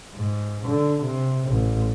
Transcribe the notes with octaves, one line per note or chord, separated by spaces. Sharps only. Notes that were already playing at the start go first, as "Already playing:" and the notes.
G#2
D3
C3
A1